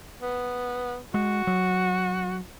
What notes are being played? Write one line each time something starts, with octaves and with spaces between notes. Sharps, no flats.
B3
G#3 F#4
F#3